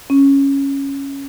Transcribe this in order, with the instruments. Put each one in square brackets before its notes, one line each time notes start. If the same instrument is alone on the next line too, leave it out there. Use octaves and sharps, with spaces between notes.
[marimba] C#4